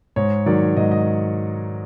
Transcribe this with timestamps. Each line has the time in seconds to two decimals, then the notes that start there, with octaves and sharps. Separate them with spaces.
0.16 G#2 C#5
0.46 D#3 F#3 D5
0.76 G#2 D#5
0.92 D#5